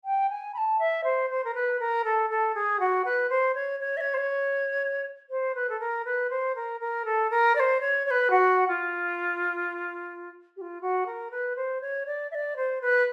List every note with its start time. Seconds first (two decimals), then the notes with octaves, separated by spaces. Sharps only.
0.05 G5
0.30 G#5
0.54 B5
0.58 A5
0.79 E5
1.04 C5
1.30 C5
1.44 A#4
1.55 B4
1.80 A#4
2.05 A4
2.30 A4
2.55 G#4
2.80 F#4
3.05 B4
3.30 C5
3.55 C#5
3.80 C#5
3.97 E5
4.01 C#5
4.14 C5
4.18 C#5
5.30 C5
5.55 B4
5.69 A4
5.80 A#4
6.05 B4
6.30 C5
6.55 A#4
6.80 A#4
7.05 A4
7.30 A#4
7.55 D5
7.60 C5
7.81 C#5
8.06 C#5
8.11 B4
8.30 F#4
8.68 F4
10.56 G4
10.61 F4
10.81 F#4
11.06 A#4
11.31 B4
11.56 C5
11.81 C#5
12.06 D5
12.31 E5
12.35 D5
12.57 C5
12.81 B4